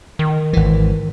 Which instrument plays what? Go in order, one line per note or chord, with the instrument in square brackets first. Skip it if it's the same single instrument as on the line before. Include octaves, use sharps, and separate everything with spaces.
[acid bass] D#3
[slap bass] G#1 E3